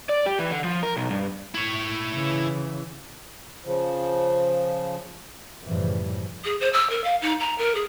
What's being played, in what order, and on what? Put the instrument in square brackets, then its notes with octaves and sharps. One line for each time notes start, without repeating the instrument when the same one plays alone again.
[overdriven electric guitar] D5
G4
E3
D3
F3
A#4
B1
G2
[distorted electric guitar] E4 C#5
[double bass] C#3 E3
[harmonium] C#3 F3
[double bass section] F#2 A2 C#3 E3 F3 G3
[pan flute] G#4
C5
E6
A#4
F5
D#4
A#5
A#4
G#4